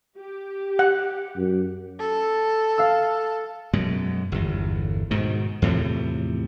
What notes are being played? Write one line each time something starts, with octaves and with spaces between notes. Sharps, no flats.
G4
F#5
F#2
A4
F5 E6
F#2 B2 G#3
G1 E2
G#2 B2 D#3
E2 A2 C3 F3